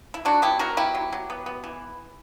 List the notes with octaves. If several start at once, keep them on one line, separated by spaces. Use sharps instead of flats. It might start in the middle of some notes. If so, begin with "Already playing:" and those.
E4
F#3 D4 F#4
B3 E4 G4
F#3 F#4 A#4
B3 E4 G4
F#3
F#3
B3
B3
E3